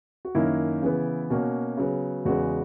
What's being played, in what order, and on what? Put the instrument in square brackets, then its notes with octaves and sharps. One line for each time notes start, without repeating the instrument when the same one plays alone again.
[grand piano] F#4
F#2 D#3 A#3 C#4 E4
C#3 E3 B3
B2 A#3 C#4 F#4
C#3 F#3 B3
E2 C#3 G#3 B3 F#4